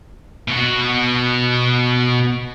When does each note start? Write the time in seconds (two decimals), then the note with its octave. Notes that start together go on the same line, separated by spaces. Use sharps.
0.48 B2 F#4